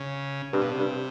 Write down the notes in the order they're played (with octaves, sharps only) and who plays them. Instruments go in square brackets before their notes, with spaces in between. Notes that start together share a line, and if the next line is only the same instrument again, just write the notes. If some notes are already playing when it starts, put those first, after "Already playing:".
Already playing: [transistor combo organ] C#3
[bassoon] G2 [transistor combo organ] C3
[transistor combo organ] B2
C3
[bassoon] G2